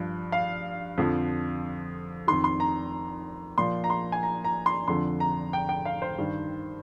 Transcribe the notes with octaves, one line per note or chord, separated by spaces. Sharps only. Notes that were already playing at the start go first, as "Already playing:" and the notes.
Already playing: G2 F3
F5
F2 D3 F3
F2 D#3 C6
C6
A#5
A#2 F3 C6
A#5
C6
G#5
A#5
A#5
C6
F2 D3 F3 C6
A#5
G5
G5
F5
C5
G2 D#3